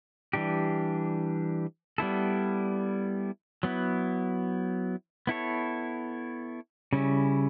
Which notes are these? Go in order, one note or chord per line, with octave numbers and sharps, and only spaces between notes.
E3 G3 D4 G4
G3 B3 E4 A4
F#3 B3 E4
B3 E4 A4 C#5
C#3 G3 C#4 E4